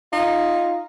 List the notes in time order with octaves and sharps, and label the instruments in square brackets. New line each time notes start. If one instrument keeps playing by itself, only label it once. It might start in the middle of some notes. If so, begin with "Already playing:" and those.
[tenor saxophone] D#4 [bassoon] F4